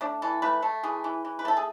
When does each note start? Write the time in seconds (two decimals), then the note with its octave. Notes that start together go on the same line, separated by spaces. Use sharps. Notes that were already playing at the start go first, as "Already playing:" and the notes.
0.01 A3 D4
0.22 E3 A4
0.42 A3 B4
0.62 A3 A4
0.83 E3 G#4
1.04 E3
1.25 E3
1.39 B4
1.45 A3 A4
1.57 G#4